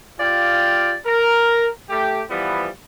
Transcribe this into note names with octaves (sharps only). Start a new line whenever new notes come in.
F4 G4 D5 F5 G5
A#4
A3 G4
E3 F3 G3 B3